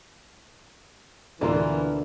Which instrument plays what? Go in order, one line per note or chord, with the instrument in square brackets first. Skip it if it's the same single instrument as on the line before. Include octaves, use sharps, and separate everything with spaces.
[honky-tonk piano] D2 B2 A#4 [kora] D3 A#3 F4 [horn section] E3